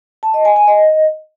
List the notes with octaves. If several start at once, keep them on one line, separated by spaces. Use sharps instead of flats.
A5
D#5
G#5
G#5
D#5